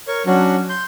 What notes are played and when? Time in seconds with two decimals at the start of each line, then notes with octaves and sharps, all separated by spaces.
0.08 A#4 C#5 C#6
0.27 F#3 C#4 D4 F#4
0.69 C6 G6